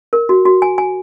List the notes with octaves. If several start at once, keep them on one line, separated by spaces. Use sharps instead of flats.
A#4
F#4
F#4
G#5
G#5